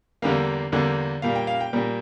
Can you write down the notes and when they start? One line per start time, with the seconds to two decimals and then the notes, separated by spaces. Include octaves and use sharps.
0.22 E2 D3 G3 A#3 F5
0.72 E2 D3 G3 A#3
1.22 A#2 G3 A#3 F5
1.35 G5
1.47 F5
1.61 G5
1.73 A#2 G3 A#3